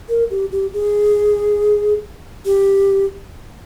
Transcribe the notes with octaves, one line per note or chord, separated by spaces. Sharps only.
A#4
G4
G4
G#4
G4